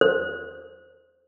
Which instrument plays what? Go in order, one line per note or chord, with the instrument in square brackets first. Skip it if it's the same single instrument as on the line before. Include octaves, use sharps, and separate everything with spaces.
[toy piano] C5